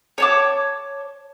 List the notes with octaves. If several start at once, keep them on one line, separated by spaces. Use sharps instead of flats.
C#5 A5 D6